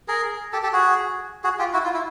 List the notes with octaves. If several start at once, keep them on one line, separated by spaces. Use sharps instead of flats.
G#4 A#4
G4 A4
G4 A4
F#4 G#4
F#4 G#4
F4 G4
E4 F#4
F4
E4